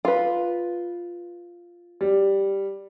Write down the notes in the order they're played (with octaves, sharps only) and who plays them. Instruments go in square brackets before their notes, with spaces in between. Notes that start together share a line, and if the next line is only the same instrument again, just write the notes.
[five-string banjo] F4 B4
[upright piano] G3